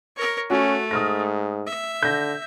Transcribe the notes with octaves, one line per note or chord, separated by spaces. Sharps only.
A#4 C#5
A3 C#4 F#4
G#2 D#6 F6 A#6
E5
D3 G6 A#6